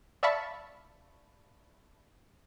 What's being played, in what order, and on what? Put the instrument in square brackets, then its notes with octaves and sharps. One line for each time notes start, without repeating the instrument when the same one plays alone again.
[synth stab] D5 E5 F5 A5 B5 C#6